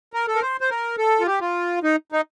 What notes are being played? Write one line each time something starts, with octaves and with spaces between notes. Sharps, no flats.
A#4
A4
A#4
C5
C5
A#4
A4
F4
G4
F4
D#4
D#4